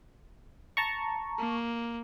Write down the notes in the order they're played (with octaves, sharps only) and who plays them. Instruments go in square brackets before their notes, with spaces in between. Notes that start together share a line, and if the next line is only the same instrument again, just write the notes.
[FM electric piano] A5 A#5 C#6
[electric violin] A#3